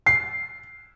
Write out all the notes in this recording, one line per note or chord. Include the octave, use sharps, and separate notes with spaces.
C7